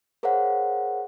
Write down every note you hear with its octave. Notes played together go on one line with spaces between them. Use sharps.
G#4 A#4 C5 C#5 F5 F#5